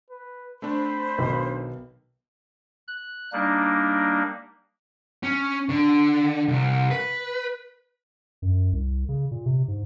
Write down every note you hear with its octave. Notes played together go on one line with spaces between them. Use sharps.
B4
A3 C4 D4 C5 B5
B1 D#3
F#6
G3 A#3 D4 D#4
C#4
D3
C2
B4
F#2
C2
C#3
A#2
C3
G#2